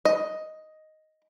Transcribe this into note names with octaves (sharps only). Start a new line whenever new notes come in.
D#5